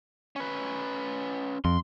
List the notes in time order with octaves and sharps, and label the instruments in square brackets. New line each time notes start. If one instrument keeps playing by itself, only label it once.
[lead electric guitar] C#4 B4
[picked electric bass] F2 [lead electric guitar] C6